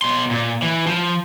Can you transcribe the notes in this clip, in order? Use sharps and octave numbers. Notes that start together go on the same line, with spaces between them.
B2 C6
A#2
E3
F3